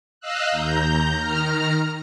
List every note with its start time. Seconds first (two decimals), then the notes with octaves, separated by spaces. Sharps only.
0.21 D#5 F5 E6 F#6
0.52 D#2 A#5 G6
1.17 D#3 A#5 F6